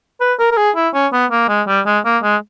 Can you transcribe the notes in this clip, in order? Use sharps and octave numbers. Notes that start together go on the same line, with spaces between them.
B4
A#4
A#4
G#4
E4
C#4
B3
A#3
G#3
G3
G#3
A#3
G#3